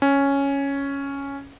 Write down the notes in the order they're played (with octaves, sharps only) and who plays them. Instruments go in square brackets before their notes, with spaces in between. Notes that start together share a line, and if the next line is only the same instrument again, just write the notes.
[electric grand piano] C#4